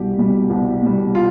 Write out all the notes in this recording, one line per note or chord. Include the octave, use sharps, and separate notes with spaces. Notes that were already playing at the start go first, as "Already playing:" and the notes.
Already playing: C2 B2 G3 G4
B2 G3
C2
B2 G3
F4